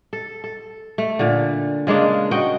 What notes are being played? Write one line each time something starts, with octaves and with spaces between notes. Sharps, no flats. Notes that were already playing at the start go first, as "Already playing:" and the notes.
A4
A4
A3
A#2 D3
C#3 G#3 A#3 D4
F#4 D#5 F#5 G5